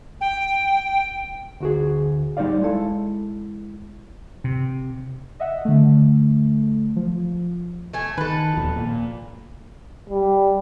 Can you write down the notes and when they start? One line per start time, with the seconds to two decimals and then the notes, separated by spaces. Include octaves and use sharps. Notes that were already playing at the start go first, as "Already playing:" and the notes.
0.21 G5
1.60 D2 F#4 G#4
2.37 G3 D#4 C5 D5 F5
2.62 G#3 E4 A4
4.44 C3
5.40 D#5 E5 F#5
5.65 D3 A3
6.96 F3
7.93 A3 G#5
8.18 D#3 A4 B4
8.57 D#1 D#2 F3
8.76 A#2
10.10 G3